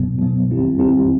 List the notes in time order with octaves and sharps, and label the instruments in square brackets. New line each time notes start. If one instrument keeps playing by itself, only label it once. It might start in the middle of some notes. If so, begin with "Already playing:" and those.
Already playing: [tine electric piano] B2 F#3 B3
B2 F#3 B3
D#3 G3 C4 E4 G4
D#3 G3 C4 E4 G4